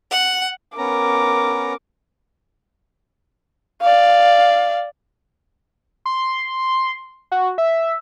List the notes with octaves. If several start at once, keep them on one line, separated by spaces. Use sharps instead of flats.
F#5
B3 C#4 A#4 A#5 D6
D5 F5
C6
F#4
E5